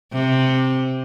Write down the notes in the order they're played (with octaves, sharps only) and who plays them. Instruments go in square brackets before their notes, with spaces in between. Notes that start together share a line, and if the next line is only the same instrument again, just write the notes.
[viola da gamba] C3